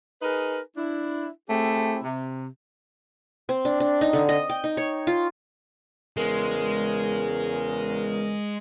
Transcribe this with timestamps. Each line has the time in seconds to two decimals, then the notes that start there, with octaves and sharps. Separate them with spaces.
0.22 D#4 G#4 A#4 B4
0.76 D4 E4
1.49 A3 C4 E4 G4 G#4
2.04 C3
3.49 C4
3.65 D4
3.80 D4
4.01 D#4
4.13 D3
4.29 D#5
4.49 G5
4.64 D#4
4.77 C#5
5.07 F4
6.17 E2 C#3 G#3 A#4